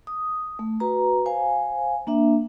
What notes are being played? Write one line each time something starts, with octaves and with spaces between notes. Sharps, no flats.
D#6
A3
F#4 B4 A#5
C5 F5 G#5
A#3 D4 E5